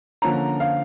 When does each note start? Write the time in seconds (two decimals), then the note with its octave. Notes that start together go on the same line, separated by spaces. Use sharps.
0.22 D3 F3 A#3 C#4 A#5
0.60 F5